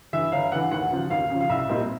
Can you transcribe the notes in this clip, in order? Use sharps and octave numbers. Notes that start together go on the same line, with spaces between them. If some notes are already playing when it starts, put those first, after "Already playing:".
G2 E3 E5
G1 F5
G2 E3 F#5
D#2 F#5
C#3 F3
D#2 F5
C#3 F3
F5
C2 E5
A#2 G3 C4 D#4